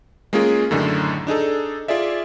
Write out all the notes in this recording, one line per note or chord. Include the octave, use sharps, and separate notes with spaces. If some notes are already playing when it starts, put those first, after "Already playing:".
G#3 A#3 C#4 F4 G#4
F#2 A2 D3 D#3
D4 D#4 G#4 A4
F4 G#4 D5 E5